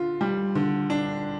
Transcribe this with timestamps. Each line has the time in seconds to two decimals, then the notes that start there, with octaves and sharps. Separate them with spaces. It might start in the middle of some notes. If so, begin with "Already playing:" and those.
Already playing: D3 F4
0.21 G3
0.55 D3
0.90 D4